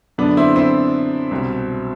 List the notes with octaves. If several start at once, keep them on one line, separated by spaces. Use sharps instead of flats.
F#2 D3 B3 D4
C4 E4
C4 E4
C2 B2